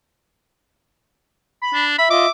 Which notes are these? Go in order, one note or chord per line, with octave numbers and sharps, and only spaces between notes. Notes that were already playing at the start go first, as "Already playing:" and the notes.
B5
D4
E5 B5
F4 D#5 D6